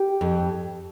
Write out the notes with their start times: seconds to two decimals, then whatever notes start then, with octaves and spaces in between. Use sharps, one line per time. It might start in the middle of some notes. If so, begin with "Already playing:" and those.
Already playing: G4
0.21 F2